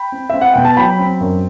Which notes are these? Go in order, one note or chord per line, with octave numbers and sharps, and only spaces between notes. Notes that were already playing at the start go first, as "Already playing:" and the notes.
Already playing: G5 B5
C4
C4 E5
F#5
B2 G5
A5
F#3 G5 B5
C4
F#2